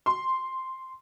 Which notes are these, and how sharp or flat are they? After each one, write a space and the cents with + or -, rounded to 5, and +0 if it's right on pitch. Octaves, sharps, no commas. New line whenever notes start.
C6 +0